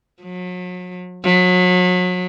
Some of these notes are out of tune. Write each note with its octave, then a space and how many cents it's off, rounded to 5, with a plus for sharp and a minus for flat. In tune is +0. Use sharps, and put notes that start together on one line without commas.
F#3 -40
F#3 -35